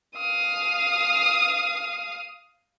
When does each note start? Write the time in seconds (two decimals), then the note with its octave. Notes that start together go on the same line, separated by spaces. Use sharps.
0.17 F5 D#6